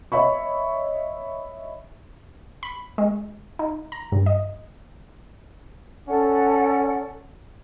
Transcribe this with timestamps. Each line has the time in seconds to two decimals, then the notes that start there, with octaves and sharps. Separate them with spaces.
0.12 C#5 D#5 E5 B5 C#6
2.63 B5
2.98 G#3
3.59 D#4
3.92 A#5
4.12 G2
4.26 D#5
6.08 C#4 A4 D5 F#5